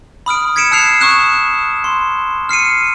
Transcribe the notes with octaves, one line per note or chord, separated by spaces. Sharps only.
B5 D#6 F6 D7
G#6 B6 C#7 D7 E7
A5 E6 F#6 C7 F7
C#6 D#6 F#6 E7
C6
F6 C7 C#7 D#7